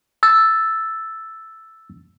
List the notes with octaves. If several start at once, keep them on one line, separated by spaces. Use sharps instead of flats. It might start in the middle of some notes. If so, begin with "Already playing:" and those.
E6 A6